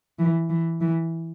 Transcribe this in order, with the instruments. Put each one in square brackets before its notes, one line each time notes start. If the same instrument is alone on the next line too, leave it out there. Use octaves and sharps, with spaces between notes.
[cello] E3
E3
E3